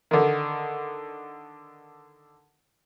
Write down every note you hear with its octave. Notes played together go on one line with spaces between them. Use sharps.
D3 D#3